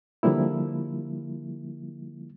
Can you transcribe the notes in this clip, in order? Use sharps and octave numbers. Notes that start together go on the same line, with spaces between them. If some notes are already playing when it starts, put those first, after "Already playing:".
D3 F3 G3 A#3 E4